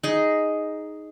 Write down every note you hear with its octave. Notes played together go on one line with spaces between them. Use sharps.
D#4 G#4